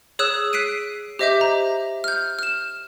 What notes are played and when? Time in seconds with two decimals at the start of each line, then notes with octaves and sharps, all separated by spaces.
0.19 G#4 C#5 D#6 E6 F#6 E7
0.53 F#6 B6 C7 D7 D#7
1.19 G4 C5 D#5 E5 D6 G6
1.41 A#5
2.04 F6 G6
2.39 F6 E7